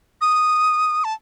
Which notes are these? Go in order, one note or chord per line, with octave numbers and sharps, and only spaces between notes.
D#6
A5